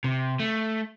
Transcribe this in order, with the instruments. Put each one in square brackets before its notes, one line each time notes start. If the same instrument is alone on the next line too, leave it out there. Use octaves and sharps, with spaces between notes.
[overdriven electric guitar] C3
A3